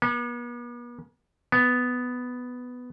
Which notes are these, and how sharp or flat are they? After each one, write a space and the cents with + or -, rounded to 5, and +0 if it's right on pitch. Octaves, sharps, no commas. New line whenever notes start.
B3 -45
B3 +5